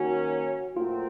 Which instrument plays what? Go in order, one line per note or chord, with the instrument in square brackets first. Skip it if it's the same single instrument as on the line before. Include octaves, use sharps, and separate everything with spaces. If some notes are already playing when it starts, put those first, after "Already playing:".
Already playing: [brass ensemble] D#3 F#3 A#3 C#4 [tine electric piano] F#4
[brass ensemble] A#2 F#3 A3 C4 [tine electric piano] F4